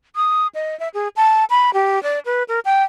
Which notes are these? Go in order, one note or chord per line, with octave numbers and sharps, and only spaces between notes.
D#6
D#5
E5
G#4
A5
B5
G4
D5
B4
A#4
G5